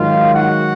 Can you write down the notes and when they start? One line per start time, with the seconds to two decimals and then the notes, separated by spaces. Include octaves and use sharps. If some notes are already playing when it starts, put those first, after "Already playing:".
Already playing: G#2 D#3 F#3 F4 F5
0.35 F#4 F#5